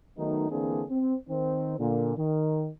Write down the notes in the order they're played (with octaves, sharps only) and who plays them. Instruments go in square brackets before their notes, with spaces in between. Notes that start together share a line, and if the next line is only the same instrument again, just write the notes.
[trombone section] D#3 F#3 A3 B3 D#4
D3 E3 A#3 C4 D4 G#4
C4
D#3 C4
A#2 D3
D#3